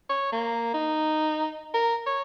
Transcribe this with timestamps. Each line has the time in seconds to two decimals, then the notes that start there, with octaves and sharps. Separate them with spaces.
0.09 C#5
0.32 A#3
0.74 D#4
1.74 A#4
2.06 C#5